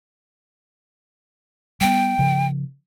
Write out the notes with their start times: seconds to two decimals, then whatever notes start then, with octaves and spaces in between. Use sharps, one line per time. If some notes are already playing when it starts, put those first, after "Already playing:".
1.81 G3 B3 G5
2.19 C#3 F3